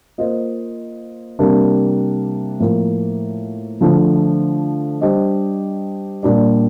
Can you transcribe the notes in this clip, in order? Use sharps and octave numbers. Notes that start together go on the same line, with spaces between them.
A#3 F4 C5 D#5
C3 G3 A#3 D4
A2 F3 A#3
D3 F3 A3
G3 D4 G4 C5 D#5
A#2 G3 D4 G4 D5